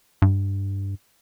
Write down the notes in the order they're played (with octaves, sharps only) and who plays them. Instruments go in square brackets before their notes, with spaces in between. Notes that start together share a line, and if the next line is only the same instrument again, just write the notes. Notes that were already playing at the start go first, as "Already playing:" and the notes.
[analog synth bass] G2